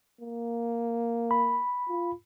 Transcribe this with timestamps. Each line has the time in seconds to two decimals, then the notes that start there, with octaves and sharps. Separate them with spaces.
0.21 A#3
1.31 B5
1.89 F4